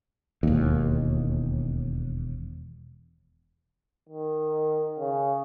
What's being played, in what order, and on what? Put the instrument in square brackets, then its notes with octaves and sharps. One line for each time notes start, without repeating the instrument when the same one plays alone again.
[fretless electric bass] E1 D#2
[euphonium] D#3
C#3